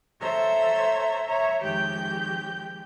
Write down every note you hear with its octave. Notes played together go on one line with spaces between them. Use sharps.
A4 C5 C#5 E5 A#5 E6
C#5 E5 A#5
F2 D#3 G#3 G4 G5 G6